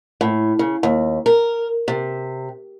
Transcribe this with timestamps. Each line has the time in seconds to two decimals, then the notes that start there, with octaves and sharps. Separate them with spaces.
0.21 A2
0.59 C#3
0.83 D#2
1.26 A#4
1.88 C3